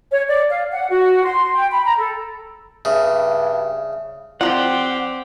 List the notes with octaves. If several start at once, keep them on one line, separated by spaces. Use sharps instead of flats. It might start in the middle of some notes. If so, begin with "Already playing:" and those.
C#5
D5
F5
F#5
F#4
C6
G5
B5
A#5
A4
G2 C#3 E5
F3 F#3 C4 F4 G4 D5 F#5